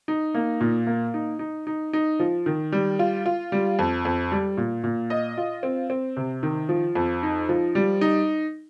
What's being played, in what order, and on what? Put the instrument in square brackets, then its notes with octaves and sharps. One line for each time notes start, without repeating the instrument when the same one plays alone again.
[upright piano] D#4
A#3
A#2
A#3
D#4
D#4
D#4
D#4
F3
D#3
G3
F4
F4
G3
F2
F2
G3
A#2
A#2
D#5
F4
C4
C4
C3
D#3
F3
F2
D#4
F3
G3
D#4